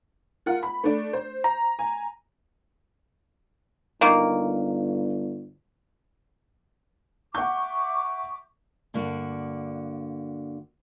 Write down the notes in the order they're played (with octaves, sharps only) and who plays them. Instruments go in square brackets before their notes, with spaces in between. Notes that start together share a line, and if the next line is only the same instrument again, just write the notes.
[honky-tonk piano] F4 A#4 F#5
B5
A3 D4
C5
[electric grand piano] A#5
[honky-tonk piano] G#5
[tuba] G1 [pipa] D#3 A#3
[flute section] E5 C#6 D6 [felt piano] F#5 G6
[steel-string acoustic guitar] G2 D3 A#3 F#4